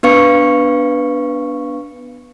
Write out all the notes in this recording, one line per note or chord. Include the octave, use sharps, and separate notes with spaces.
B3 D4 B4 F5 C#6 C#7